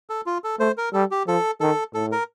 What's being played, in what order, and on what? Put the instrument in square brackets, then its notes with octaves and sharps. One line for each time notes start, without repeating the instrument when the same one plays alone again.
[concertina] A4
F4
A4
[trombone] A3 [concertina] C5
[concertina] A#4
[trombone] G3 [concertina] A4
[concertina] G4
[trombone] F3 [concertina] A4
[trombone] D#3 [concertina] A4
[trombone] A2 [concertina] A4
[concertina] A#4